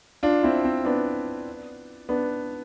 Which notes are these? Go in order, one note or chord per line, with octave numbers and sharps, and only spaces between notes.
D4 F4
C4 E4
C4
B3 D4
B3 D4